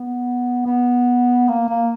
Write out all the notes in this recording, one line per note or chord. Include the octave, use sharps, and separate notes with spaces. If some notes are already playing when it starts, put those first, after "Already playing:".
Already playing: B3
B3
A#3
A#3